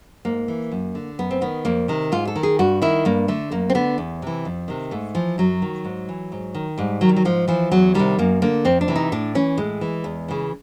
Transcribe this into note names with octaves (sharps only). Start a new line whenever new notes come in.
G#2 A#3
E3
F#2
D3
F#2 B3
C4
D#3 B3
F2 A#3
C3 D#3
G#2 F4
A4
D#3
G#4
G2 F#4
D#3 E4
G2 A#3
D3 A3
F#2 A#3
C4
D3 B3
E2
C3 E3
F2
C3 D#3
G#2 A3
E3 F3
F#2 F#3
D#3
G#2
E3
G#2
D#3
G#2 G3
D#3 F#3
G3
F#3
G#2 F3
E3 F3
E2 F#3
C3 D#3 G3
F#2 A#3
D3 A#3
F2 C4
D4
C3 E3
D#4
A2 D4
E3 C#4
A2 G#3
E3
E2
C#3 E3